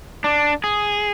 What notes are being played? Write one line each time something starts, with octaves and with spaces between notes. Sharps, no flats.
D4
G#4